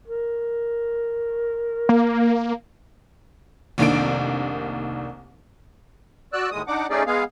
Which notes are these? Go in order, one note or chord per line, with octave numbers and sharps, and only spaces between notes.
A#4
A#3
F1 C2 D#3 A#3 D4 D7
F#4 D5 E6 F#6
D#2 A2 G#3 D#6
D4 D#4 F#5 D6
A3 C#4 D#4 G#4 D5
G#3 B3 G#4 F5